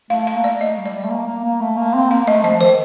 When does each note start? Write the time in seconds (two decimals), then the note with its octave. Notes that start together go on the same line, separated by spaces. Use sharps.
0.10 A3 F5
0.27 F5
0.36 A#3
0.44 D5
0.60 A3 D#5
0.78 G3
0.86 D5
0.94 G3
1.04 A3
1.11 A#3
1.28 A#3
1.44 A#3
1.61 A3
1.77 A#3
1.94 C4
2.11 A#3 F5
2.27 A3 D#5
2.44 F3 D#5
2.61 D#3 C5